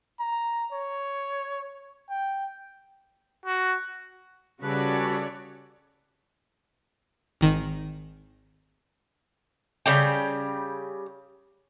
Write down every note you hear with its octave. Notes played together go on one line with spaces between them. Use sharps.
A#5
C#5
G5
F#4
C#3 G3 C#4 F#4 A4 B4 C#5 D5
G#1 D#3
C#3 G3 G5